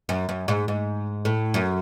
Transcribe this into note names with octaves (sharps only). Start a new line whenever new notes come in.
F#2
F#2
G#2
G#2
A2
F#2